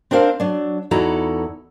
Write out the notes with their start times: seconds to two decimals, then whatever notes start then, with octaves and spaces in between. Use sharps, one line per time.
0.11 C4 D4 A#4 C5 F5
0.40 F#3 D4
0.91 E2 D#4 E4 F#4 A4 A#5